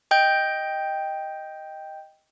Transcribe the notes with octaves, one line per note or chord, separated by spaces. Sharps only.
D#5 G5 G6